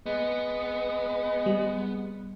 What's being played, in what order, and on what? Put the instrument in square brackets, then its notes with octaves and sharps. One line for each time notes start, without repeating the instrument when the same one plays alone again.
[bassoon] G#3 [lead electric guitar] B3
[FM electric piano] G3